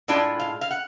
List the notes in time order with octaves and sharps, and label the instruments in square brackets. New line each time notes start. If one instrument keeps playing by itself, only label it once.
[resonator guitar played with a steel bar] A2 G#3 D4 F4 D5
F5
F5
F#5